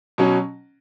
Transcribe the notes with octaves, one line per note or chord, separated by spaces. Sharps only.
B2 F#3 C#4